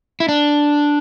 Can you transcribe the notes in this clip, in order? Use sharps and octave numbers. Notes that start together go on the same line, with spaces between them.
E4
D4